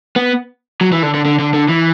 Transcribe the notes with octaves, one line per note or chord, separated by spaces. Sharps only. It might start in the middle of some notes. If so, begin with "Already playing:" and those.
B3
F#3
E3
D3
D3
D3
D3
D3
E3